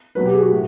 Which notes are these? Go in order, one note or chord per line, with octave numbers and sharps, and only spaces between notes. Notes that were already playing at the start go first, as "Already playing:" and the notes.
B2 F#3 B4
G4
G#4
F#4
A2